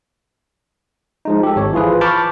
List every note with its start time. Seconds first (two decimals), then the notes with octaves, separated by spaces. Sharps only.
1.25 F3 G#3 D#4
1.43 G4 A4
1.56 G#1 C#5
1.73 E3 F3 F4 G#4 B4
2.01 A5 B5 C#6 D6 F6 G6